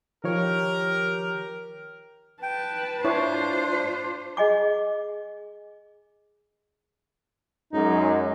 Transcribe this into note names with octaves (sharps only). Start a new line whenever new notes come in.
D#3 F3 G4 A#4 C#5
B4 G5 A5
D4 E4 F4 C5 C#5
G#4 D#5 G#5 D6
F#2 G#3 D#4